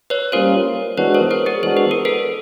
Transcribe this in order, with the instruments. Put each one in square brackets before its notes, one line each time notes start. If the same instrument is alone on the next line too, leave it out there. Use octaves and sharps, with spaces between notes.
[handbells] B4 C#5
[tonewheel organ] G3 A#3 C#4 F4 [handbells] A#4 C5
[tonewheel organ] E3 G#3 B3 D4 F#4 [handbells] B4 C#5
[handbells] A#4 C5
A#4 C5
G#4 A#4
[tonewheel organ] E3 G#3 B3 D4 F#4 [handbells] C5
[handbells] B4
A#4
A4 B4